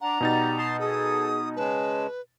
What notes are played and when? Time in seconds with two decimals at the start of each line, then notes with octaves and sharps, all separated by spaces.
0.01 D4 F#5 A#5
0.21 B2 G3 D#4 A6
0.58 A5 C6 D#6
0.80 G#4 A4 D#6
1.56 C#3 G#3 B4 A5